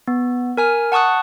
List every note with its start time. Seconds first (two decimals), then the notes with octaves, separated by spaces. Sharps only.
0.08 B3
0.57 A#4 G#5 F6
0.92 F#5 A5 C#6 D#6 F#6